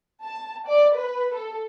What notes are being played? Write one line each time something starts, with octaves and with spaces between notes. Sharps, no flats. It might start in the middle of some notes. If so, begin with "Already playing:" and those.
A5
D5
B4
A4